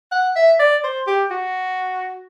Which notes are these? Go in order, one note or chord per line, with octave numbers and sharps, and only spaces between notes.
F#5
E5
D5
C5
G4
F#4